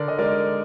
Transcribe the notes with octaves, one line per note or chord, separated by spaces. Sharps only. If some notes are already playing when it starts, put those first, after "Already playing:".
Already playing: D3 A#4 D5
D#5
G#3 D#4 A#4 D5